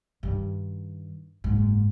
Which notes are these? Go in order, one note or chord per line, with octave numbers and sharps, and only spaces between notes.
G2 D#3
F#1 G#2